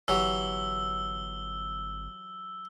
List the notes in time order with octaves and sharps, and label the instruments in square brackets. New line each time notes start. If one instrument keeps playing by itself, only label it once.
[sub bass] G1 [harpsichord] E3 F#3 G4 [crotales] E6 G7